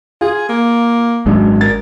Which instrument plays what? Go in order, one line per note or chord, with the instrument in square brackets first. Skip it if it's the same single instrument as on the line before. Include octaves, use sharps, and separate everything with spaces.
[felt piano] F4 [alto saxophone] G#4
[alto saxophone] A#3
[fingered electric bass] G#1 G#3 D4 [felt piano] F#2
[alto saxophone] A#4 [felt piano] A6